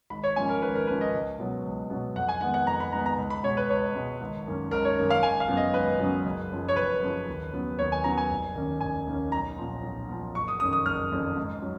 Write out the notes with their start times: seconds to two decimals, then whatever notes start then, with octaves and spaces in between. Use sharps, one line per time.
0.10 G#1 B5
0.24 C#5
0.36 G#2 F3 A#3 C#4 G#5
0.49 A#4
0.62 G#1 B4
0.75 A#4
0.87 G#2 F3 A#3 C#4 B4
1.01 D#5
1.14 C#2
1.39 B2 F#3 B3
1.65 C#2
1.90 B2 F#3 B3
2.16 F2 F#5
2.29 G#5
2.41 D#3 G#3 B3 F#5
2.54 F#5
2.66 F2 A#5
2.80 B5
2.92 D#3 G#3 B3 A#5
3.06 A#5
3.18 C#2
3.30 B5
3.44 B2 G#3 C#5
3.57 B4
3.70 C#2 C#5
3.95 B2 G#3
4.21 G#1
4.47 F#2 D#3 A#3 C#4
4.71 G#1 A#4
4.85 C#5
4.97 F#2 D#3 A#3 C#4
5.10 F5
5.23 G#1 G#5
5.40 F5
5.48 F#2 C#3 F#3 B3
5.57 D#5
5.74 G#1 B4
5.99 F#2 C#3 F#3 B3
6.26 F#1
6.51 F#2 F3
6.69 C#5
6.76 F#1 B4
7.02 F#2 F3
7.28 D#2
7.53 C#3 F#3 B3
7.79 D#2 C#5
7.92 G#5
8.04 C#3 F#3 B3 A#5
8.18 G#5
8.31 F1
8.55 D#2 D#3 A#3 C#4
8.81 F1 G#5
9.07 D#2 D#3 A#3 C#4
9.32 B1 A#5
9.58 A#2 F3
9.83 B1
10.09 A#2 F3
10.35 F#1 C#6
10.48 D#6
10.60 F2 D#3 A#3 C#4 D#6
10.73 D#6
10.86 F#1 F6
11.12 F2 D#3 A#3 C#4
11.36 G#2
11.62 F#3